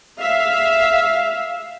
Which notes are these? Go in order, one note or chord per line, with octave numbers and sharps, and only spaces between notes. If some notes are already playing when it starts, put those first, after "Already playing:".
E5 F5